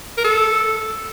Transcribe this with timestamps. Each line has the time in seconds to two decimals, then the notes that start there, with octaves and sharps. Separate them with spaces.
0.18 A#4
0.25 A4